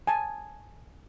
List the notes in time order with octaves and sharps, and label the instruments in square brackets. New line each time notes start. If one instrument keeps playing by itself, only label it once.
[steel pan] G#5 A5